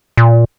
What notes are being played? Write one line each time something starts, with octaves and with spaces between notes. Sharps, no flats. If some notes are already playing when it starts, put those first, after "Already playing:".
A#2